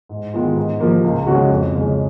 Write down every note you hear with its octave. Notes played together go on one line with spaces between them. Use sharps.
G#2
D#3 G#3 B3 F4
G#2
F3 A#3
C#2
C#3 G#3 C#4 F#4
F2
C#3 G#3 C#4